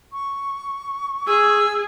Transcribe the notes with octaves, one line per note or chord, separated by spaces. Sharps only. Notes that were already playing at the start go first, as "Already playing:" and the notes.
C#6
G#4 E6